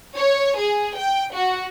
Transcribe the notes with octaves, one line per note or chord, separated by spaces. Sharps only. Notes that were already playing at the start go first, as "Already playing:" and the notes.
C#5
G#4
G5
F#4